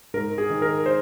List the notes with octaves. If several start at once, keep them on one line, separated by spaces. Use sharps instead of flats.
G#2 A#4
G#4
D#3
A#4
C5